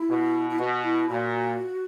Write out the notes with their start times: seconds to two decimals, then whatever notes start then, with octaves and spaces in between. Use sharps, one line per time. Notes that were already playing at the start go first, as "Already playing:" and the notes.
Already playing: E4
0.09 B2
0.50 E4
0.58 B2 F#4
0.84 E4
1.09 A#2 F#4